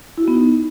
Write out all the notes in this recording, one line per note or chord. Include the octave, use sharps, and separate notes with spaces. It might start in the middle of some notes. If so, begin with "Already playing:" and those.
E4
F#4
B3
D#4